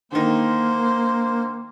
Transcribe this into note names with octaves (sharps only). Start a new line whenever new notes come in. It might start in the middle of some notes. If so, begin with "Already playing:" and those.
D3 D#3 A#3 C5